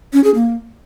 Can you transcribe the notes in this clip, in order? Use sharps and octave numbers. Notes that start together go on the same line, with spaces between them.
C#4
G#4
A#3